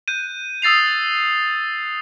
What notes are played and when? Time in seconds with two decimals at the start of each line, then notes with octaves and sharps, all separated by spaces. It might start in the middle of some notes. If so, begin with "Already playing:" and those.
0.08 F#6 G6 D#7
0.62 D#6 E6 A6 C7 F7